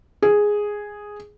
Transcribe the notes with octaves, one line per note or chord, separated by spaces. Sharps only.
G#4